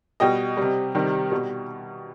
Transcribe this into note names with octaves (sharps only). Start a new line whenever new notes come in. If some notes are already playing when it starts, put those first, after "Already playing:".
B2 G3 D#5 G5
C3 G3
C3 D#3 G3
B2 G3